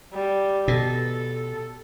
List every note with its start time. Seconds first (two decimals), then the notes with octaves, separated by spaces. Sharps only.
0.13 G3
0.68 B2 A4